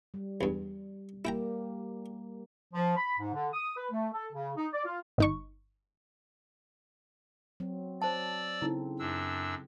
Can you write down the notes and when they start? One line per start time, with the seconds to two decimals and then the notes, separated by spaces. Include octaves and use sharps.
0.14 G3
0.41 E2 G2
1.25 G3 A#3 E4 G4 G5 A#5
2.74 F3
2.97 B5
3.19 G#2
3.34 D3
3.53 D#6
3.77 B4
3.91 A3
4.13 A4
4.33 C#3
4.57 D#4
4.73 D5
4.85 F4
5.18 G1 D#4 C#6
7.60 F#3 C4
8.02 C5 D5 A5 E6
8.62 C#3 C4 D#4 E4 A4
8.99 F#2 D4 E6